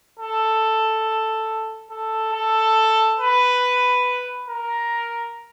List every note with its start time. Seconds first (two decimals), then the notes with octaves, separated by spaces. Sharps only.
0.19 A4
1.90 A4
2.34 A4
3.19 B4
4.49 A#4